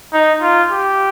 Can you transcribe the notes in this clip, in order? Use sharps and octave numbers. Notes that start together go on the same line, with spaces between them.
D#4
F4
G4